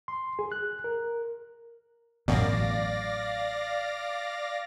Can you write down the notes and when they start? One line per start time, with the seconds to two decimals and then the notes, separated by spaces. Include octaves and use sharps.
0.08 C6
0.39 G#4
0.52 F#6
0.84 A#4
2.28 A1 F#2 B2 F#3 D5 F5 A#6